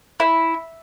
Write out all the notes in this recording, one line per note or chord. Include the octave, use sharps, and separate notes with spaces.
E4